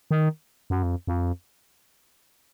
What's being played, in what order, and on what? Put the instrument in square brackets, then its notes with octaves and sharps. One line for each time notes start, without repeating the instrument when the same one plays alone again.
[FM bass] D#3
F#2
F2
F2